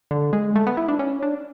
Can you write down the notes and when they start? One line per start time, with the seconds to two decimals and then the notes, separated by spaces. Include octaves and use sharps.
0.11 D3
0.33 G#3
0.56 A3
0.67 B3
0.77 E4
0.88 D4
0.99 C#4
1.22 D4